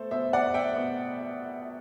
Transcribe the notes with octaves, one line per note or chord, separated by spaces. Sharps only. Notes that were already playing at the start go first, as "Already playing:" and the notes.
Already playing: B2 A3 A4 C5
B2 C5 E5
D5 F#5
A3
E5 G5
B2